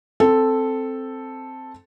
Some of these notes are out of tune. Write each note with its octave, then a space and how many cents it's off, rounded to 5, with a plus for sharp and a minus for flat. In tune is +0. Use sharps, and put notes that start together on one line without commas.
C4 +0 A4 +0